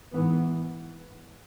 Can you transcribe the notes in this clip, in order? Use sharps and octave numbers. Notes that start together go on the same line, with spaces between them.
G#2 E3 B3